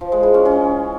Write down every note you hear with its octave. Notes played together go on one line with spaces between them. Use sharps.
F3
G#3
E3
C#4
C#4